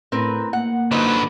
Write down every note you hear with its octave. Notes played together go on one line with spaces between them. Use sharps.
A2 C4 A#4 B4
A#3 F#5
D3 F#3 D#4 B4 C5